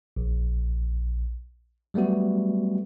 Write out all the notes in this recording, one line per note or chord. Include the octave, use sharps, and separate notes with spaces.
A#1
F#3 G3 A3 B3 F#4